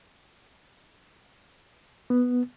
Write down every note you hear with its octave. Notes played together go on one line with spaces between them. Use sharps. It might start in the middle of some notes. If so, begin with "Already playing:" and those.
B3